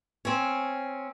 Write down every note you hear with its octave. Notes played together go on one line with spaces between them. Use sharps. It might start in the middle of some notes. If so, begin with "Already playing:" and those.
C4 C#4